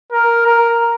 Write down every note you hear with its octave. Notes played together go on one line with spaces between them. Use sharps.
A#4
A#4